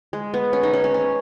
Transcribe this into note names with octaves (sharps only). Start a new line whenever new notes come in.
G#3
B3
C#4
D#4
C#4
C#4
C#4